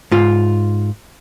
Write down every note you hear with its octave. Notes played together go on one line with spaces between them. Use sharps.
G#2 F4